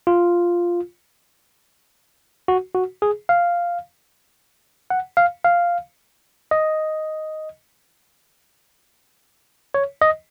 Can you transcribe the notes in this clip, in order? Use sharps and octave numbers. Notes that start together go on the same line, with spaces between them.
F4
F#4
F#4
G#4
F5
F#5
F5
F5
D#5
C#5
D#5